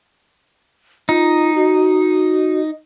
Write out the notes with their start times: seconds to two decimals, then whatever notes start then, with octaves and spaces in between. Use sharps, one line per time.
1.09 D#4 F4
1.55 F#4